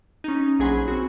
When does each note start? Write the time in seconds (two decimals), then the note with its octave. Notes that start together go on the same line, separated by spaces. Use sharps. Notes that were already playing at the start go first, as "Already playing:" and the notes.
0.24 C#4 D#4
0.59 A#1 F#3 G#4 G#5 B5 C6
0.88 C4 F#4